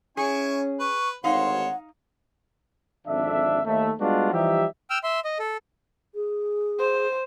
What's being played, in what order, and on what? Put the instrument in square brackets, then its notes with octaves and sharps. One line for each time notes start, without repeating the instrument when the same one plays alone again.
[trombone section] C#4 [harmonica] E4 G#5 C#6 [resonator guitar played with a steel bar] G#4
[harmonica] B4 [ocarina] C#6
[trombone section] G#1 D2 [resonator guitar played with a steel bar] D#4 F5 [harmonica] C5 C#5 C6 [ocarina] F#5
[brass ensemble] G#1 F2 D3 D4 E5
D#2 A3 E5
G3 G#3 B3 D4 F4 F#4
E3 F3 G3 D#4 G4 E5
[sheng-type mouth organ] G5 E6 F6
E5 C6
D#5
A4
[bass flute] G#4
[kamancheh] C5